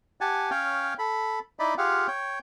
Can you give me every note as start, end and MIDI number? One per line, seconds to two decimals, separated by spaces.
0.21 0.50 67
0.21 0.50 78
0.21 0.50 80
0.21 0.50 81
0.51 0.94 61
0.51 0.94 73
0.51 0.94 77
0.51 0.94 79
0.99 1.39 69
0.99 1.39 83
1.59 1.74 63
1.59 1.74 64
1.59 1.74 74
1.59 1.74 75
1.59 1.74 83
1.78 2.07 65
1.78 2.07 67
1.78 2.07 68
1.78 2.07 77
1.78 2.07 78
2.07 2.39 73
2.07 2.39 79